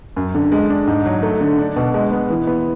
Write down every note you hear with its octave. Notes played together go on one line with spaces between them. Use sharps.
F#2
D3
G#3
D4
G#2
F#3
A3
D3
D4
B2
G#3
B3
E3
B3